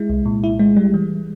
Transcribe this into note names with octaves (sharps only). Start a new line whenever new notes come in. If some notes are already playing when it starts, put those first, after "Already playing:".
Already playing: G#3 E4
C2
A#2
E4
G#3
G3
E3